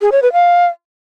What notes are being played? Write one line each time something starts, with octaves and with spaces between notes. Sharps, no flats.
G#4
C#5
B4
F5